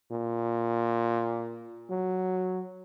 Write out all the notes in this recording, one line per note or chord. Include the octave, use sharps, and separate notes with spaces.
A#2
F#3